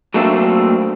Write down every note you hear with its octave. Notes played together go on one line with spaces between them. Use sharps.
F#3 A3 A#3 C4 D4 E5